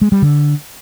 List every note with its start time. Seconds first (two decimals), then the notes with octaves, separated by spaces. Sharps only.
0.01 G#3
0.12 G3
0.22 D3